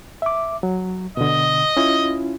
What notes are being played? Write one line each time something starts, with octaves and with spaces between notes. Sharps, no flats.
E5 D6
F#3
B2 D3 D#5
C#4 E4 F4